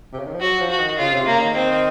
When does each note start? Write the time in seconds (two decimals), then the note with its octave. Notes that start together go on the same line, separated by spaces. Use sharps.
0.12 C3
0.19 C#3
0.27 D#3
0.34 F3
0.41 F#3 F#4
0.60 F3
0.69 F#4
0.79 D#3
0.98 C#3 F4
1.13 C3
1.26 C#3 A#3
1.40 D#3
1.55 C4